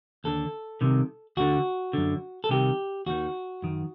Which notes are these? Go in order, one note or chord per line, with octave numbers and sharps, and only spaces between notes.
D#2 D3 A4
C2 C3 D#3
D2 D3 F#4
F#2 D3
A4
C2 C3 D#3 G4
D#2 D#3 F#4
F#2 D#3